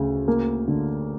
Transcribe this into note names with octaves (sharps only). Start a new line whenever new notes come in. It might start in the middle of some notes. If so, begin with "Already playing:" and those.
Already playing: D2 C#3
A#3
D3